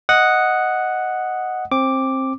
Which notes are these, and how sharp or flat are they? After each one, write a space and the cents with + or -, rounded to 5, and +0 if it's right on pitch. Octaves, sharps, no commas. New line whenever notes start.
D#5 +0 F#5 +0 D#6 +0
C4 +20 D6 +0